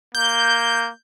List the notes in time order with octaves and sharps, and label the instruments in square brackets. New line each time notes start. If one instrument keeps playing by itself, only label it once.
[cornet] A#3 [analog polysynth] G6